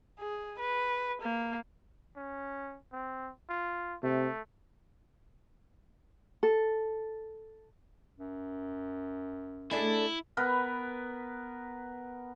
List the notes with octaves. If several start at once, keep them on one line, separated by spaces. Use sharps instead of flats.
G#4
B4
A#3
C#4
C4
F4
C3 A3
A4
F#2
A3 D4 E4 G#4
B3 A#4 B4